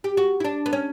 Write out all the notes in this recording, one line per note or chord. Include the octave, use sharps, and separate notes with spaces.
G4
F#4
E4
D4
B3
C#4